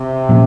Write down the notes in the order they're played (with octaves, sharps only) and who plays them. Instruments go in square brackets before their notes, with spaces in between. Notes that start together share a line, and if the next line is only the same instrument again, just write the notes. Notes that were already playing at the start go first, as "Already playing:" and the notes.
Already playing: [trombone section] C3
[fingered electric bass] A#2 F3 A#3 C#4